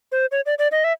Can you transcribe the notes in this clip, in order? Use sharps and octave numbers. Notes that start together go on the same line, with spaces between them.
C5
C#5
D5
D5
D#5
E5